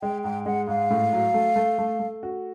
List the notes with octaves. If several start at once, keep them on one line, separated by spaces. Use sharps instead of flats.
G#3 G5
G#2 G5
G#3 F#5
G#2 F5
A2
F#3
A3
A3
A3
A3
F#4